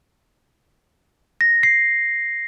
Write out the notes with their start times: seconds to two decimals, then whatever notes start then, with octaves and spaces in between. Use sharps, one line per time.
1.41 A#6
1.63 C7